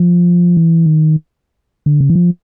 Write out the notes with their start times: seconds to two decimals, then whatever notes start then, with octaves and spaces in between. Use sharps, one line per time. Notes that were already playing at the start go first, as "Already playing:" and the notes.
Already playing: F3
0.57 E3
0.86 D#3
1.86 D3
2.00 C#3
2.10 E3
2.15 F3